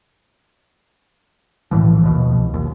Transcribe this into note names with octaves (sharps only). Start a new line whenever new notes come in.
B1 A2 E3 F3
D#2 B2 F3
C2
A#1 D#2